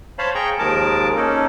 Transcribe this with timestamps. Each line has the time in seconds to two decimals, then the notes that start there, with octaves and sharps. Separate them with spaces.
0.19 C5 C#5 F5 A5 B5
0.35 G#4 G5 A#5 C#6
0.59 D#2 F3 G#3 A#4 A5 D6
1.16 A#3 C#4 D#4 A4